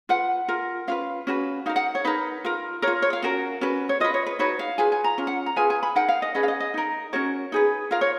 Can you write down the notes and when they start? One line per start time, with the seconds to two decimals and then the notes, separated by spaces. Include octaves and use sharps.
0.09 F4 B4 F#5
0.48 F4 A#4
0.87 C#4 F4 B4 F5
1.27 C#4 F#4 B4
1.66 D#4 A#4 F5
1.76 F#5
1.95 C#5
2.05 D#4 A#4 B4
2.45 F4 A#4
2.82 A#4 C#5
2.87 F4
3.02 C#5
3.13 F5
3.22 C#4 F#4 A#4
3.61 C#4 F#4 B4
3.89 C#5
4.00 F4 B4 D#5
4.14 C#5
4.26 B4
4.39 D#4 F#4 B4 C#5
4.59 F5
4.78 F4 G#4 B4 G#5
4.92 G#5
5.04 A#5
5.18 C#4 F4
5.27 F#5
5.46 A#5
5.56 F4 G#4 B4 G#5
5.70 G#5
5.83 B5
5.96 D#4 A#4 F#5
6.08 F5
6.22 D#5
6.35 C#4 G#4 B4 D#5
6.43 F5
6.48 D#5
6.60 D#5
6.74 D#4 A#4
7.13 C#4 F#4 A#4 C#5
7.52 D#4 G#4 B4
7.91 F4 A#4 F5
8.01 C#5